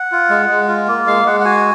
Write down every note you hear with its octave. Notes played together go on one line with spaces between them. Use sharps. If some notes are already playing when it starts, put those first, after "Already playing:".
Already playing: F#5
F4
G#3
G#3
F4
A#3
G#3 F5
G#3 F#5
F#5
F#4 G#5